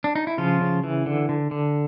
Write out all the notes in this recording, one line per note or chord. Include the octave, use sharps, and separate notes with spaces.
D4
D#4
E4
C#3 F3 F4
C#3
E3
D3
D3
D3